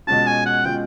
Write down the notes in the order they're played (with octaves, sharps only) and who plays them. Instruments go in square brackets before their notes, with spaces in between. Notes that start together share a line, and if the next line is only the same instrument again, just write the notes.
[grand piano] B2 G#3 C#4 F4 [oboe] A5
[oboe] G#5
F#5
[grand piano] B2 G#3 C#4 F4 [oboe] G5